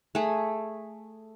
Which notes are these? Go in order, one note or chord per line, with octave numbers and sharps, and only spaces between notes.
A3 G#4